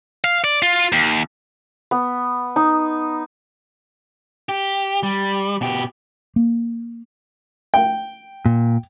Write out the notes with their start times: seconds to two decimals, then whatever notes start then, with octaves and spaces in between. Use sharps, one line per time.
0.24 F5
0.44 D5
0.62 F4
0.93 D#2
1.91 B3
2.56 D#4
4.49 G4
5.03 G3
5.61 B2 G4
6.36 A#3
7.74 G5
8.46 A#2